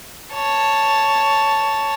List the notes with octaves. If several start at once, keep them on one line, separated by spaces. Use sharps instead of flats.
C#5 A5